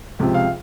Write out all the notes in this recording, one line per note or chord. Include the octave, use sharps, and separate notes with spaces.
C#2 C3 F3
F5